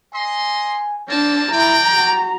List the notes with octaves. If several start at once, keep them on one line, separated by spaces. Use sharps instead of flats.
D#5 G#5 C6
A#3 C4 D4 A5
E4 D5 G5 A#5
F#4